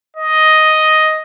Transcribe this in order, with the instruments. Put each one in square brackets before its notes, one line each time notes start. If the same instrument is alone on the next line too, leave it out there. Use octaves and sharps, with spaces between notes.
[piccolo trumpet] D#5